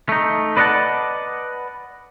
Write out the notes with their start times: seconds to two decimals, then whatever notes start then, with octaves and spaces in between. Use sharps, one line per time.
0.09 A3 D#4
0.57 B4 D5 D#5 F5 F#5 A5